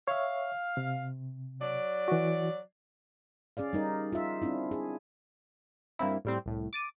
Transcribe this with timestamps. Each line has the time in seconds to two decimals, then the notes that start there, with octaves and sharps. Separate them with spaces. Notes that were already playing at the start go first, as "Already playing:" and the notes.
0.08 C#5 E5 F5
0.77 C3
1.62 F#3 D5
2.08 E3 F#4
3.57 C#4 G#4 D5 F5
3.73 G3 D#4 A#4
4.13 F4 E5
4.42 C4 D4 E4
4.71 G#4
5.99 G2 A#3 C4 E4
6.25 A2 G3 C4
6.46 C2 A2
6.73 D6 A6 D#7